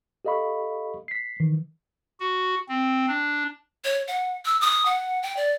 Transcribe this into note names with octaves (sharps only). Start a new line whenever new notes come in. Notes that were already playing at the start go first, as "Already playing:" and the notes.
G4 A4 D#5 F5 B5 C#6
B6 C7
D#3 E3
F#4
C4
D4
C#5
F#5
E6
D#6
F#5
G5
D5